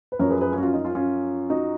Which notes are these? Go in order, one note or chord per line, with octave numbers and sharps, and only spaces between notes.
B4
F#2 F3 A#4 C#5
G#4 B4
G#4 B4
C#4 F4
F#4
C#4 F4
D#4
C#4 F4
C#4 F4
D#4 F#4